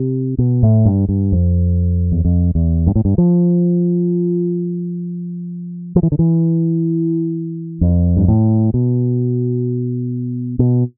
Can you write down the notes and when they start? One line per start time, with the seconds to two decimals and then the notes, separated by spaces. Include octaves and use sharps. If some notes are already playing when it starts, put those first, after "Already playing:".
Already playing: C3
0.38 B2
0.63 A2
0.85 G2
1.09 G2
1.32 F2
2.12 E2
2.25 F2
2.55 E2
2.87 G2
2.95 A2
3.05 G2
3.18 F3
5.96 F3
6.03 E3
6.12 D3
6.19 E3
7.81 F2
8.17 G2
8.28 A2
8.74 B2
10.59 B2